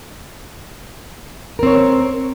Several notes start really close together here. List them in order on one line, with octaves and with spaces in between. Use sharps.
A#4 C4 C#5